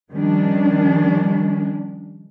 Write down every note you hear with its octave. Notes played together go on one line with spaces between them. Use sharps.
D#3 F3 G3 C#4 D4